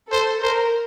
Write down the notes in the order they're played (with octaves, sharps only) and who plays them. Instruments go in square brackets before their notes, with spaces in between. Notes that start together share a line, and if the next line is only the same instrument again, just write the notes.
[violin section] A4 [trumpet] C5
[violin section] A#4 [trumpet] C5